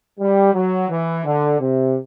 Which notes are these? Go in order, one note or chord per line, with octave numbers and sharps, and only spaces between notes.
G3
F#3
E3
D3
C3